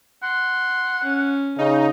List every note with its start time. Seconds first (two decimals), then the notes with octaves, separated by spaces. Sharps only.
0.23 F#5 C6
1.04 C#4
1.58 C#3 D#4